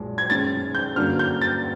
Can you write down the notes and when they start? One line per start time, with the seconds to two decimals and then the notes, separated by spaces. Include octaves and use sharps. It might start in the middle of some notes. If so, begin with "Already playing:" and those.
Already playing: B1 A#2 G#3
0.18 G#6
0.30 F#2 D#3 G#3 C#4 A6
0.75 G6
0.96 G2 D3 F#3 A#3 C#4 F6
1.19 G6
1.41 A6